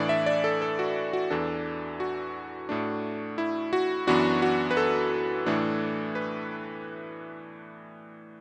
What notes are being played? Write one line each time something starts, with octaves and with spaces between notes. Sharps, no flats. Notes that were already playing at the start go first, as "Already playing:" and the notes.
Already playing: A2 E3 D4 D5
E5
D5
A4
A4
F#4
F#4
E2 E3 D4 A4
F#4
A2 A3 D4
E4
F#4
F#2 E3 B3 D4 F#4
F#4
B4
A4
A2 E3 A3 D4
B4